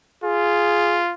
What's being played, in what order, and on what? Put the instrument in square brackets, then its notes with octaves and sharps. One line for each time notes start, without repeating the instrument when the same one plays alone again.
[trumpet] F4 [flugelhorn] G#4